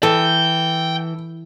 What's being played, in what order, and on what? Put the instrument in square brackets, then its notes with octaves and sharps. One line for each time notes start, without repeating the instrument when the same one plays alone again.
[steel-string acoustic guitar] E3 [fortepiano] A4 [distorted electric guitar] G5